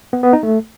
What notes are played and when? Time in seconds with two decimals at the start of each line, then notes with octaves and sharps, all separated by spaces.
0.13 B3
0.23 B3
0.33 D#4
0.43 A3